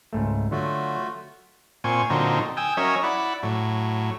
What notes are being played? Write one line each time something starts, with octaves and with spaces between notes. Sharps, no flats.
C#2 G#2 A3
D3 F#3 A3 F4 F#4
A#2 C4 G#5 C#6
A#2 D3 F#3 C4 D#4
G5 G#5 D#6 E6
F#3 C#4 A#4 C#5 D#5 E5
E4 D5 F#5 B5
A2 F#3